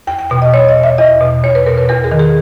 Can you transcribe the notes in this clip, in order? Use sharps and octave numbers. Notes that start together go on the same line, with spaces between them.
E2 G5
G5
B2 G5
D#5
E2 C#5
D#5
B2
E5
E2 D#5
B2
E2 C#5
B4
B2 A#4
B4
E2 A#4
G#4
D#3
G#4